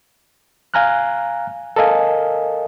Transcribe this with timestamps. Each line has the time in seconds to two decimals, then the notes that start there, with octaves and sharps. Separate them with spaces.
0.74 F5 G#5 A#5 F6 F#6
1.76 A4 A#4 D#5 F5 G#5